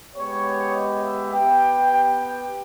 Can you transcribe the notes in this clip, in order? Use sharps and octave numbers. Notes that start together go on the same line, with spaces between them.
G#3 B3 G4 C#5
D#5
E5
B3 G4 G5
G5